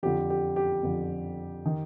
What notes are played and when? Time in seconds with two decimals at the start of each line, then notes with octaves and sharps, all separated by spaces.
0.03 F2 D3 F3 G4
0.30 G4
0.56 G4
0.83 F2 D3 F3
1.66 D#3